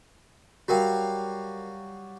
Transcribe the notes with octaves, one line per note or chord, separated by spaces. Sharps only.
F#3 G3 F#4 A#4 F5 G5